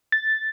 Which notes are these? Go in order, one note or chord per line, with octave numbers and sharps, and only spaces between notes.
A6